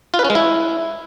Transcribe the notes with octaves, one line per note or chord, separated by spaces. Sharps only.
F4
B4
C#4
G#3
E4